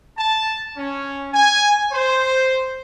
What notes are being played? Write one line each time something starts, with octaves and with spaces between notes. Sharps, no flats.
A5
C#4
G#5
C5